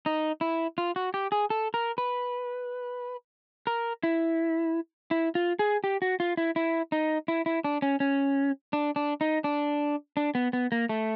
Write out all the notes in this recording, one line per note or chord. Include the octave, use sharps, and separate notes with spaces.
D#4
E4
F4
F#4
G4
G#4
A4
A#4
B4
A#4
E4
E4
F4
G#4
G4
F#4
F4
E4
E4
D#4
E4
E4
D4
C#4
C#4
D4
D4
D#4
D4
D4
B3
B3
A#3
A3